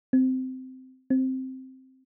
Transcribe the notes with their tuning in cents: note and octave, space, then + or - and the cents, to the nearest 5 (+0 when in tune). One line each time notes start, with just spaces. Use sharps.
C4 -15
C4 +0